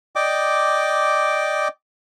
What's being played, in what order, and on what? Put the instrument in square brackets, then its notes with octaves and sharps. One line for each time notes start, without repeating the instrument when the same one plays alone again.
[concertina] D5 D#5 G5 D6